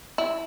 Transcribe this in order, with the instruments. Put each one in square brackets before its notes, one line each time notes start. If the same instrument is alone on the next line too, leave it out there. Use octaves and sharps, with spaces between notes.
[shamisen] E4